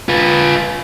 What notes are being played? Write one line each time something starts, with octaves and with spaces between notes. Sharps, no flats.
F4 B4